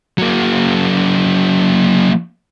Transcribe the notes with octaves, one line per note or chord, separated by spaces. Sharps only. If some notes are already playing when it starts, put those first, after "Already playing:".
F#3 A#3